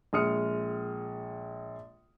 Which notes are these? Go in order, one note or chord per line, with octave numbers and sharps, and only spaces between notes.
A#1 G#3 D#6 F6 C#7